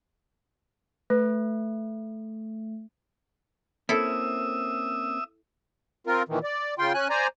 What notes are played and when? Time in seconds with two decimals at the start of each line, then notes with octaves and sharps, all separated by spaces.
1.10 A3 B4
3.89 A#3 C4 C#4 E4 A4 E5 D#6 E6
6.07 C4 F4 A#4
6.28 A#2 D#3 E3
6.43 D5
6.79 C#3 F4 G5 C6
6.94 C#4 G#5 F#6
7.10 C5 D5 G#5 A#5